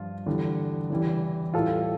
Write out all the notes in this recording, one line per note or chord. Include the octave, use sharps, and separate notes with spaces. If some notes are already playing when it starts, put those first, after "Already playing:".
Already playing: G2 F3 F4
E2 D3 G3
E2 C#3 E3 G3
A2 E3 G3 F4 A4